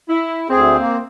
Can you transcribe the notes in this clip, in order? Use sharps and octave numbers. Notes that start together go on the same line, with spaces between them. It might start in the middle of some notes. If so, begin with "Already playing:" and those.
E4
D2 C4 G#4
A#3